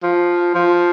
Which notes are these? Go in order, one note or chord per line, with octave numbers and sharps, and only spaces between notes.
F3
F3